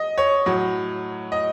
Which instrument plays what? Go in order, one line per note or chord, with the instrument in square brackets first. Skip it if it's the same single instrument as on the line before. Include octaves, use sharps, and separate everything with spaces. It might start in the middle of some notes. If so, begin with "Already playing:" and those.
Already playing: [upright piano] D#5
C#5
A2 F#3
D#5